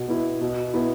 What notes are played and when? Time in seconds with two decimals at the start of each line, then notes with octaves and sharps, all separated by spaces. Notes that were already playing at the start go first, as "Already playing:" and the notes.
Already playing: B2
0.08 B3 E4
0.41 B2
0.74 B3 E4